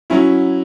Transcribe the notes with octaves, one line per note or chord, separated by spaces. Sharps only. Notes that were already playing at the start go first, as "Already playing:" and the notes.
F#3 C#4 E4